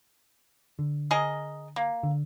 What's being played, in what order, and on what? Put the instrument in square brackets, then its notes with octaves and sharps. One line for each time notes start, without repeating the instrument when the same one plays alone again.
[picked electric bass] D3
[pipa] G#4 A#4 D#5
A#3
[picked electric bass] D3